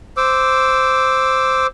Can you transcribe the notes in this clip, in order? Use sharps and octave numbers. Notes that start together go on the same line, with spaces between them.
C5 D6 E6